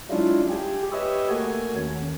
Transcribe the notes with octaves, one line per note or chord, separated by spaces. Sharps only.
F#3 G#3 C#4 D4 E4 F4
G4 G#4
G4 B4 C#5 D#5 E5
A3 A#3 F#4 G#5
D#2 C#4